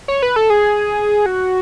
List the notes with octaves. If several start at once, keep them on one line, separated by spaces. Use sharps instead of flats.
C#5
B4
A4
G#4
F#4